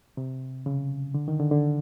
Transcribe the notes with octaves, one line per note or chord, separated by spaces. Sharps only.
C3
C#3
D3
D#3
D3
D3